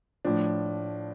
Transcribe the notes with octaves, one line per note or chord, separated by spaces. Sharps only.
A2 F3 D4